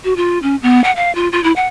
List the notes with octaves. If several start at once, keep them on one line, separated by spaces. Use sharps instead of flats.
F#4
F4
C#4
B3
F#5
F5
F4
F4
E4
F#5